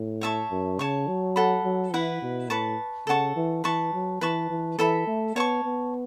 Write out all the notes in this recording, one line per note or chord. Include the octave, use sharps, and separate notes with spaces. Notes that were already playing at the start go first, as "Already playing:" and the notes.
Already playing: A2
C#5 E5 A5 C#6
F#2
C#3 C#5 A5 C#6
F#3
A4 F#5 B5
F#3
E3 E4 B4 F#5
B2
A2 B4 A5 C#6
C#3 A4 F#5 A5 C#6
E3
E3 B4 A5 C#6
F#3
E3 B4 A5 C#6
E3
E3 A4 E5 B5
A3
B3 C#5 A5 C#6
B3